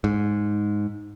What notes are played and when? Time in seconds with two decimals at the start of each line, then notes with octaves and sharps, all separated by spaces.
0.04 G#2